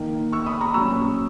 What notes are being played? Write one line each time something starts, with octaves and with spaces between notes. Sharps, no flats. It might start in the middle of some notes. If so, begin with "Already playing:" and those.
Already playing: D#3 A#3 D#4
C#6 E6
B5 D#6
A#5 C#6
A#2 F#3 C#4 C#6 E6